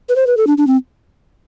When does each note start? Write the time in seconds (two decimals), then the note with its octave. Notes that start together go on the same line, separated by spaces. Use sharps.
0.09 B4
0.16 C5
0.27 B4
0.37 A4
0.47 D4
0.58 D4
0.67 C4